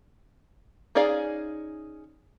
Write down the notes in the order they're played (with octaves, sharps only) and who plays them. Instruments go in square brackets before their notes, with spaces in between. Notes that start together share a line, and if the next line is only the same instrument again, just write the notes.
[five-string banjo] C#4 D#4 G#4 D5 F5